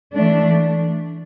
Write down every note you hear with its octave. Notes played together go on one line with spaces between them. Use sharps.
E3 A3 D4